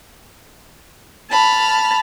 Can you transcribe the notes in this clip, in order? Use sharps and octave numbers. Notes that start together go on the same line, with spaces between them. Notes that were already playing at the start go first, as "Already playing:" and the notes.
A5 B5 F6